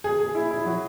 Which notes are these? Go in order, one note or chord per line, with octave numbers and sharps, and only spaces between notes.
G#4
G#4
E4
E4
F#3